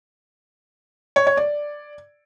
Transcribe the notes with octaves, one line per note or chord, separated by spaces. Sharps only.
C#5
C#5
D5